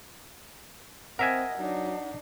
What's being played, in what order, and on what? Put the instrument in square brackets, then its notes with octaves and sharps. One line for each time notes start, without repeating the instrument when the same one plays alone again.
[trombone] C4 [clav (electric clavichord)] A#4 E5 G#5 [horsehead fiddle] D#5 [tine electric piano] F#5
[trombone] F#3 [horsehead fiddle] D4 D#4